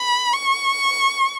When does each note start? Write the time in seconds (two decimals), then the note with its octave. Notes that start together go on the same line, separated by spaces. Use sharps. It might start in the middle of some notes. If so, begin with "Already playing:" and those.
Already playing: B5
0.33 C#6